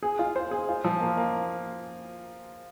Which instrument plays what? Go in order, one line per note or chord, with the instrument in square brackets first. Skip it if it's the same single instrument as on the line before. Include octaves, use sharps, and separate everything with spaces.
[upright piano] G#4
F4
C5
G#4
F4
F3
A#3
A#3